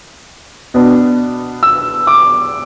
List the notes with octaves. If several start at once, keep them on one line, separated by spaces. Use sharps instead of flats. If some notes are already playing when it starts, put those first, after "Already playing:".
B2 B3 D4
E6
D6